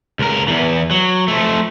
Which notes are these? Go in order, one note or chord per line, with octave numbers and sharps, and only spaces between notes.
C#2 A#4
E2 E3
F#3
F3 A3